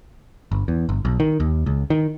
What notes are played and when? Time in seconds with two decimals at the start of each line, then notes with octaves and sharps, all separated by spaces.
0.52 G1
0.68 E2
0.89 G1
1.05 B1
1.20 D#3
1.40 D#2
1.66 C#2
1.90 D#3